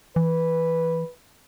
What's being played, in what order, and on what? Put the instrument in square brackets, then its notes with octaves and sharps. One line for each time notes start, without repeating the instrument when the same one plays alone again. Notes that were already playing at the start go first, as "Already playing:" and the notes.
[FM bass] E3 [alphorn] B4